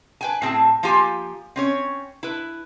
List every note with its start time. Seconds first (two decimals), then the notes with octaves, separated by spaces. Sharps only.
0.21 B4 G5 G#5
0.42 A2 C4 G#4 A5
0.83 F3 A#3 F4 G4 G#5
1.56 C4 C#4 C#5
2.23 E4 B4